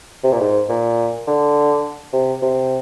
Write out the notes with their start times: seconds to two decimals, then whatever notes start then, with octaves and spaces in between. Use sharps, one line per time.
0.24 C3
0.32 A#2
0.40 G#2
0.69 A#2
1.27 D3
2.13 C3
2.42 C3